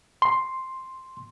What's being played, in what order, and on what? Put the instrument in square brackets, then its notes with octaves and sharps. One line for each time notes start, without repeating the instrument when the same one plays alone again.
[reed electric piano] C6